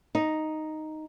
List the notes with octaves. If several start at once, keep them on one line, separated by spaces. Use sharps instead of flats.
D#4